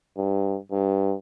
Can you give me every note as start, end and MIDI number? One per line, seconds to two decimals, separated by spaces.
0.17 0.57 43
0.72 1.15 43